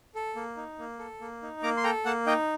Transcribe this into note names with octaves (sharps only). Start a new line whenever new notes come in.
A4
A#3
D#4
A#3
A4
A#3
D#4
A#3 A#5 D6
C6
A4 G5 A#5
A#3 F#5 A5
D#4 D#5 G5